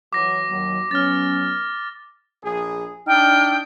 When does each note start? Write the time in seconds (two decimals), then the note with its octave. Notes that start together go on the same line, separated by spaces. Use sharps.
0.13 E3 F#3 D6 A#6
0.49 D#2 F#3
0.91 F#3 B3 C#4 F6 A6
2.44 A#1 G#4
3.07 D4 D#4 G5 F6